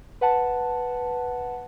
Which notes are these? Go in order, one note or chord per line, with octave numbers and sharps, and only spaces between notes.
B4 F#5 A5